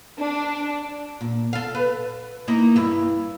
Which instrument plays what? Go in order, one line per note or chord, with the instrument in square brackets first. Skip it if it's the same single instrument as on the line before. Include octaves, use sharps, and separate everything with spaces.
[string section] D4
[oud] A#2
A4 F5
B4
A#3 D#4 E4
G2 E4